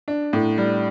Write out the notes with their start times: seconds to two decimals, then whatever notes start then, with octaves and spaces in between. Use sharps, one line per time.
0.08 D4
0.33 A2
0.58 G3